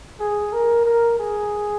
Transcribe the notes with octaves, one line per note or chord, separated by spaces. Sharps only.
G#4
A#4
A#4
G#4